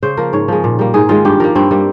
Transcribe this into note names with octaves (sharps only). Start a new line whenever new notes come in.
C#3 C5
F3 A#3 A#4
G#2 C#5
F3 G#3
A#2
G3 A#3
G#2 G#4
D#3 G#3 F4
G2 G4
F3 A#3 A#4
G2 C4
G3 A#3